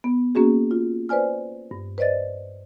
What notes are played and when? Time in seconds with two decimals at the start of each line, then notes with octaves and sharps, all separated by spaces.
0.04 B3
0.35 A#3 C#4 F#4 G#4
0.71 F4
1.09 B4 C5 D5 G#5 F6
1.71 G2
1.98 B4 C5 D5 D#5 A6